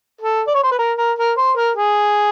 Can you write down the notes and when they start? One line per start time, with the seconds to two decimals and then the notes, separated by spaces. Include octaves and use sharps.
0.21 A4
0.47 D5
0.54 C#5
0.63 C5
0.71 B4
0.79 A#4
0.98 A#4
1.19 A#4
1.37 C5
1.57 A#4
1.75 G#4